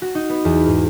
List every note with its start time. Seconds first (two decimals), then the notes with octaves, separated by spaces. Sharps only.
0.02 F#4
0.15 D#4
0.30 B3
0.45 E2
0.66 G#2